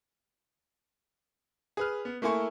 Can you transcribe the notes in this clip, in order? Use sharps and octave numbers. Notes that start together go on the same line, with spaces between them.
G#4 B4 F6
B3
A3 A#3 E4 G#5 C#6